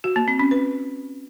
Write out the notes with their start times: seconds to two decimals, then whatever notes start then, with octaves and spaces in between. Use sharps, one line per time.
0.04 F#4
0.16 A#3
0.28 C4
0.39 C#4
0.51 B4